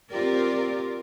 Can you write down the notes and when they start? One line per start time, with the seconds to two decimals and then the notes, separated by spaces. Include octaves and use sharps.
0.10 C4 F4 G4 A#4 D5